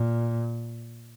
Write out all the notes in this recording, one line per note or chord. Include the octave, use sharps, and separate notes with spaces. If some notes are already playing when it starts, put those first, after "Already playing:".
Already playing: A#2